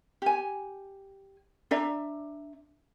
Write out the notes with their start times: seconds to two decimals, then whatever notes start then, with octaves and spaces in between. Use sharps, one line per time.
0.22 G4 G#5
1.71 D4 D5 E5 A#5